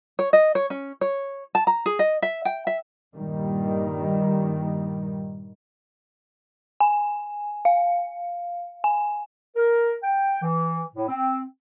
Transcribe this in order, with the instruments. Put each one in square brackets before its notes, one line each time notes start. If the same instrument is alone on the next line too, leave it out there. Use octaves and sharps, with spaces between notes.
[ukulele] C#5
D#5
C#5
C#4
C#5
A5
A#5
G#4
D#5
E5
G5
E5
[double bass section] G2 A#2 D#3 G3
[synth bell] G#5
F5
G#5
[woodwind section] A#4
G5
E3
A2
C4